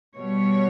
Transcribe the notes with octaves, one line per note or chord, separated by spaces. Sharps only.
B2 G3 C#5